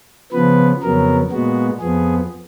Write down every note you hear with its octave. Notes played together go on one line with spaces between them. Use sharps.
C#3 F3 B3 B4
F2 C#3 F#3 B3 A#4
A#2 G#3 B3 F#4
F2 F3 B3 G#4